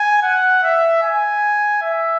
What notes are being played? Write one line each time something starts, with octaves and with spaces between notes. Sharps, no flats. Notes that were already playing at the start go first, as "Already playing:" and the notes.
Already playing: G#5
F#5
E5
G#5
E5